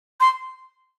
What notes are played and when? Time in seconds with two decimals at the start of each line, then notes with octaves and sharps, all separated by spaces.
0.20 C6